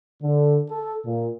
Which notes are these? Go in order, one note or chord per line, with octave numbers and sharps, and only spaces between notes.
D3
A4
A#2